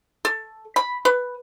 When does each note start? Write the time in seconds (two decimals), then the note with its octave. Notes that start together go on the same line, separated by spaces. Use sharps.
0.25 A4
0.76 B5
1.05 B4